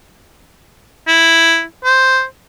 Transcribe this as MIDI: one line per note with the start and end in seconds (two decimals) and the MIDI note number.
1.08 1.63 64
1.84 2.23 72